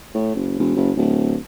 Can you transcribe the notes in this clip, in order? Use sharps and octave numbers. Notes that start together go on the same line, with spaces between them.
A2
F#1
E1
F#1
D1